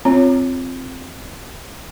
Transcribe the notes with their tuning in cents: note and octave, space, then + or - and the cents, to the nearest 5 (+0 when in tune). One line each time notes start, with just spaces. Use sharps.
C4 +0 F4 +0 C#5 +0